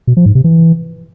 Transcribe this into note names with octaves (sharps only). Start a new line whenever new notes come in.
B2
F3
G#2
C3
E3